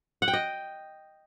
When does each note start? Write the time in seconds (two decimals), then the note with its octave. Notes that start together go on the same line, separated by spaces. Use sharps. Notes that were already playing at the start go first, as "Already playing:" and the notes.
0.22 F#5
0.28 G5
0.33 D#5